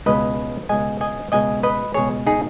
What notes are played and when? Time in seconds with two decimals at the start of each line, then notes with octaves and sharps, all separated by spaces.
0.06 C#2 B2 G#3 B4 D#5
0.69 C#2 B2 G#3 D#5 G#5
1.01 D#5 G#5
1.32 C#2 B2 G#3 D#5 G#5
1.63 B4 D#5
1.94 C#2 B2 G#3 G#4 C#5
2.27 D#4 G#4